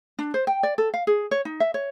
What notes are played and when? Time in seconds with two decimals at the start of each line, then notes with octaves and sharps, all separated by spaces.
0.19 D4
0.34 C5
0.47 G5
0.63 D5
0.78 A4
0.94 F5
1.07 G#4
1.31 C#5
1.45 D#4
1.60 E5
1.74 C#5